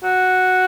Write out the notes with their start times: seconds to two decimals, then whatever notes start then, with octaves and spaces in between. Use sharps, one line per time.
0.04 F#4